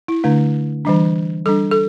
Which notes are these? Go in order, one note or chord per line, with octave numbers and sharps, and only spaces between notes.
E4
D3 A3 D4
E3 G3 D4
G3 D4 A4
A4